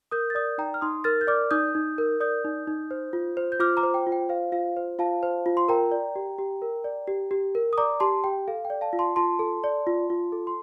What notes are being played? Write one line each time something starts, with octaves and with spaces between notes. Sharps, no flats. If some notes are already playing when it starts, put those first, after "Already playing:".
A#4 D#6 G6
A6
D5 D#6 G6
D#4 G5 A#5
F6
D#4 C6 D#6
A#4 F6 A6
G6
D5 D6 F6
D#4 D#6 G6
D#4
A#4
D5 D#6 G6
D#4
D#4
C5
F4
C5
G6
F4 D6 F6
A#5 D6
C5
G5
F4
G5
C5 F5
F4 F5
C5
F4 F5 A5
C5
F4
C6
A#4 G5 A#5
D5
G4
G4
A#4
D5
G4
G4
A#4
D#6
D5 A#5 D6
G4 A5 C6
G4 G5
A4 F5
G5
D5
F5 A5
F4
A5 C6
F4 A5 C6
A4
D5
F4
F4
A4
C6